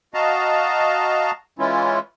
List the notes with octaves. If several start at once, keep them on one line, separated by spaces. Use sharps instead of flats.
F#4 D#5 F5 A5 A#5
E3 G#3 C#4 E4 F4